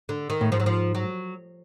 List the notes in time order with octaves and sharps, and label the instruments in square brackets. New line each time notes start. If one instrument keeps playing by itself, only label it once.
[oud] D3
D#3
[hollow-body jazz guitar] A2
[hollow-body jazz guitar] G#2 [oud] F3
[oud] F#3
F3
F#3